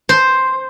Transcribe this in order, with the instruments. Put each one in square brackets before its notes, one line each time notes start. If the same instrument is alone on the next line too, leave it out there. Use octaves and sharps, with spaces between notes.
[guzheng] C5